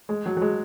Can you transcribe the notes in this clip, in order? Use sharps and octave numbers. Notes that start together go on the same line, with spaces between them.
G#3
F#3
F#3
G#3